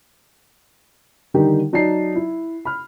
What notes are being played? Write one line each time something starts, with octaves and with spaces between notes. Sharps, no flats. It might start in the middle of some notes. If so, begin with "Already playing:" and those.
D3 D#3 G3 D#4 G4 A#4
F#3 D#4 D5 A5 C7
E4
B5 F6